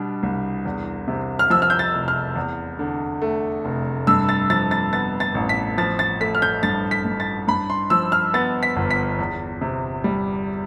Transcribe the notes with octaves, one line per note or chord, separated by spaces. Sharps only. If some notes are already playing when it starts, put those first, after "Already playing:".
Already playing: B2 G3 D4
C2
E2
C3
F6
F3 E6
F6
G6
A6
F1
F6
E2
D3
A3
F1
G2 E6
A6
F3 A6
A6
B3 A6
A6
A1
B6
F3 A6
A6
A3 B6
F6
G6
G2 A6
B6
G2
A6
G2 B5
C6
F3 E6
F6
B3 A6
B6
G1
B6
E2
C3
G3